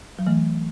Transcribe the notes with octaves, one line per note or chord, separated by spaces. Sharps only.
F#3
E3 A3